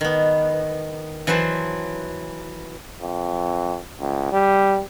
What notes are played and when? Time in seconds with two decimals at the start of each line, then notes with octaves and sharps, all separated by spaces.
0.01 D#3 B3
1.27 E3 F#3 B4 C5 A5
3.02 F2
4.00 C#2
4.32 G3